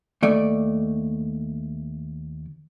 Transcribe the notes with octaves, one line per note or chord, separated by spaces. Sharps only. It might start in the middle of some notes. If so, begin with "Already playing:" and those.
D#2 A3 D5